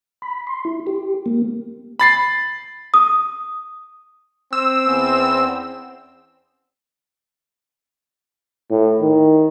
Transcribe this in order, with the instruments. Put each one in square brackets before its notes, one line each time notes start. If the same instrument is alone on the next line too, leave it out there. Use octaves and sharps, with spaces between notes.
[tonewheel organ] B5
C6
E4
G4
A#3
[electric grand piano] B5 A6 C7
[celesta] D#6
[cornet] C4 [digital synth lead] E6
[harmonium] E2 B3 C#4
[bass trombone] A2
D#3